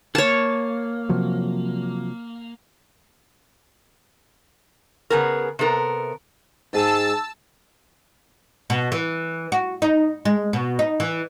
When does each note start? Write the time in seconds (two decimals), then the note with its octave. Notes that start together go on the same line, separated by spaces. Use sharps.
0.15 A#3 C#5 A5
1.09 C3 F3 F#3
5.10 C#3 B3 G#4 A#4
5.59 C3 B3 A4 A#4
6.73 G#2 G#4 A5 E6
8.70 B2
8.92 E3
9.52 F#4
9.82 D#4
10.25 G#3
10.53 B2
10.79 D#4
11.00 E3